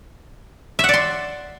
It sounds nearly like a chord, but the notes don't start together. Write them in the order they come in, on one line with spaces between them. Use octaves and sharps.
E5 F#5 D5 C6